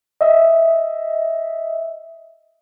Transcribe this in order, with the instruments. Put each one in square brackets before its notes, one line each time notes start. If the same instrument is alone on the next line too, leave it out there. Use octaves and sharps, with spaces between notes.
[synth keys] D#5 E5